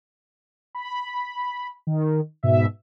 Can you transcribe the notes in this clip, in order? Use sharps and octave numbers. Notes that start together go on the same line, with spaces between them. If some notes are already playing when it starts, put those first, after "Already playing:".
B5
D#3
G#2 B2 E5